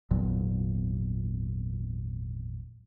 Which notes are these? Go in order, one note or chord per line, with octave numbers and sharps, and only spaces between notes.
G#1 E2 A#2 F#3